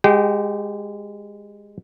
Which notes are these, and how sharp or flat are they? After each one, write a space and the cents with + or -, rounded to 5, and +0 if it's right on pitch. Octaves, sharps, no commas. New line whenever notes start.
G#3 -15 G4 +0 G5 -35